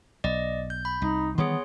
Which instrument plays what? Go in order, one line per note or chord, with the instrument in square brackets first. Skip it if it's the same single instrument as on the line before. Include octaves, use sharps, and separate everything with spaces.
[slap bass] B1 [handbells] D5 D#5
[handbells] G6
B5
[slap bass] C2 [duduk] D#4
[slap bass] D#3 E3 G3 [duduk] B3 [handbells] G#4 C#5 C6